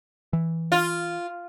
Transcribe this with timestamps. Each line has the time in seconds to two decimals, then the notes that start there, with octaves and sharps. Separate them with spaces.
0.33 E3
0.72 F4